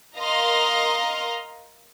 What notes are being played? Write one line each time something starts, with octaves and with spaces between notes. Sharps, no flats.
A#4 D#5 F5 A#5 C6